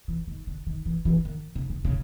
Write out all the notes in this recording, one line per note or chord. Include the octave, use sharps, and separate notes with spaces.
E3
D#3
D3
D#3
E3
E3
D#3
C#3
C#3
C#3